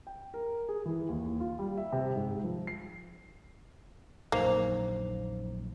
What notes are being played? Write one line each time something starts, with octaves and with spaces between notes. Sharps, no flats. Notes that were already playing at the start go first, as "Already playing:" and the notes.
G5
A#4
G#4
E3
D#2
F4
G3
E5
C3
G#2
F3
C7
A#1 F#2 F#3 A#3 D#4 C5 F7